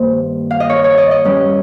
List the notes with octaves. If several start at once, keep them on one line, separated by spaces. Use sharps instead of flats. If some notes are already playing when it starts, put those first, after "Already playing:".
Already playing: G2 D#3 A#3 C5
F5
D#5
C#5
C#5
D#5
D#5
G2 G3 C#4